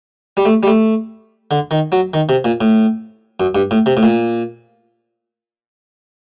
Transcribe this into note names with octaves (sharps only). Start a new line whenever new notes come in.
G3
A3
G3
A3
D3
D#3
F#3
D#3
C3
A#2
A2
F#2
G2
A2
C3
A2
A#2